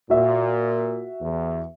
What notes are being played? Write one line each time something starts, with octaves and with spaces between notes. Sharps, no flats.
A#2 F#4 E5
E2